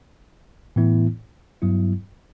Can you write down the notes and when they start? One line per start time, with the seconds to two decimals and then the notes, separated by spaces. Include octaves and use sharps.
0.76 A2 E3 B3 E4
1.62 G2 F#3 B3 E4